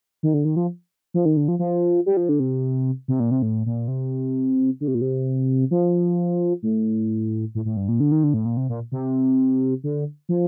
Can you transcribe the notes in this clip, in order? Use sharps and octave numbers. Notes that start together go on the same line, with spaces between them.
D#3
D3
D#3
F3
F3
D#3
D3
F3
F3
G3
F3
D3
C3
C3
A#2
C3
A2
A#2
C3
D3
C3
A#2
C3
F3
A2
A2
A2
G2
A#2
D3
D#3
D3
A2
A#2
C3
A#2
C3
D3
F3